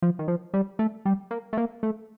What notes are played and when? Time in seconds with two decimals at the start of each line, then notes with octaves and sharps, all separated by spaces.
0.02 F3
0.19 D#3
0.28 F3
0.54 G3
0.79 A3
1.05 G3
1.31 A#3
1.53 A3
1.57 A#3
1.83 A3